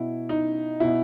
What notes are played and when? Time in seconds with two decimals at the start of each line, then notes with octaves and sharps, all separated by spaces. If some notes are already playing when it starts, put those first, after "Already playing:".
Already playing: B2 E4
0.29 D#4
0.80 B2 E4